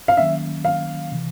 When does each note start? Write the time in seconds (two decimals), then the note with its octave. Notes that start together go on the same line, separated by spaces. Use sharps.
0.08 F5
0.17 D#3 F#3 A#3 C#4 E5
0.65 F5
1.12 C3 E3